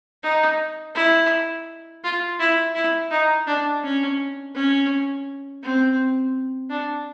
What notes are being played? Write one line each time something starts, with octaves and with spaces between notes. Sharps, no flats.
D#4
E4
F4
E4
E4
D#4
D4
C#4
C#4
C4
D4